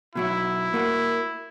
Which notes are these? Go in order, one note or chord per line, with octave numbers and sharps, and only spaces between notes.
B2 F#3 E4 F#4
A#3 F#4